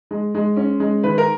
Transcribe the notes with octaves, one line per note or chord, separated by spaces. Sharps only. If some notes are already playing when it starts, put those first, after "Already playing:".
G#3
G#3
C#4
G#3
D#3 B4
A#4